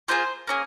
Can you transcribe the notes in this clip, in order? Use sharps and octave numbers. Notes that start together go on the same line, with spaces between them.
A#3 F4 G#4 C5
A#3 C#4 G#4